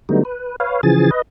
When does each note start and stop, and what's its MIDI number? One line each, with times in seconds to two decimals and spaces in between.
0.09 0.23 50
0.09 0.23 54
0.09 0.23 55
0.09 0.23 57
0.09 0.23 59
0.09 0.23 63
0.25 0.56 71
0.60 0.81 71
0.60 0.81 73
0.60 0.81 77
0.83 1.11 49
0.83 1.11 52
0.83 1.11 53
0.83 1.11 68
0.83 1.11 80
0.83 1.11 93
1.11 1.22 71
1.11 1.22 75